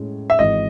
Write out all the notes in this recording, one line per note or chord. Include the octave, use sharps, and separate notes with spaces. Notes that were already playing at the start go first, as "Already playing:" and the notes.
Already playing: A2 G#3 C#4
E5
G#1 G#2 E3 D#5